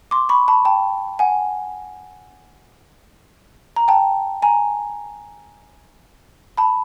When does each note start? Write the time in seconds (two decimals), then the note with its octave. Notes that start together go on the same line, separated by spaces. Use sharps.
0.11 C6 D6
0.29 B5 C#6
0.48 A5 B5
0.65 G5 A5
1.19 F#5 G#5
3.76 A#5
3.88 G5 A5
4.42 G#5 A#5
6.57 A5 B5